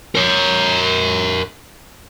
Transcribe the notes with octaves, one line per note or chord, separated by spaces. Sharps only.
A#4 C#5